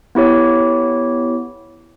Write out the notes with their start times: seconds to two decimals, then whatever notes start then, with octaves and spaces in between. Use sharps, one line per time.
0.15 B3 E4 G4 C#5